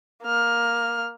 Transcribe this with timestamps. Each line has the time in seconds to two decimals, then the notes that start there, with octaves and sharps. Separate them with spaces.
0.24 A#3 F6